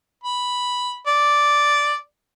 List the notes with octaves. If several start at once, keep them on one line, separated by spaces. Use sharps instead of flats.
B5
D5